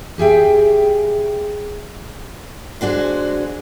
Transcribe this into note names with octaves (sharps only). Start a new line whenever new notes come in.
G4 G#4 E5 G5
G#3 D4 F#4 C5